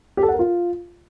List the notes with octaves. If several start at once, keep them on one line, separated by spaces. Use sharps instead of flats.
G4
A4
F#5
A#4
F4